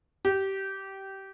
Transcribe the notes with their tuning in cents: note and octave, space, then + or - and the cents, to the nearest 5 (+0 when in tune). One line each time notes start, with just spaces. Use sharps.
G4 -20